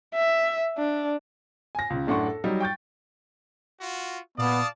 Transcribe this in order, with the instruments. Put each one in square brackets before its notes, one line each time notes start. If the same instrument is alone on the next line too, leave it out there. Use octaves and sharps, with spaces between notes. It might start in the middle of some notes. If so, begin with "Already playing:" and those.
[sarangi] E5
D4
[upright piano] G#5 A#6
C#2 C#3
F#2 A2 D4 F#5 C6 C#6
A4
F#3 G3 D#4
G5 C#6 G6 A6
[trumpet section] F4 F#4
[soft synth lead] A#2 [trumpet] B3 [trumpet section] D5 F5 A5 [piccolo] D#6